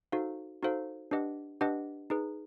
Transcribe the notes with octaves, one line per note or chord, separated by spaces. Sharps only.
D#4 F#4 A4 C5 F5
D#4 F#4 A4 C5 F5
D4 G4 B4 D#5 F#5
D4 G4 B4 D#5 F#5
D#4 G#4 B4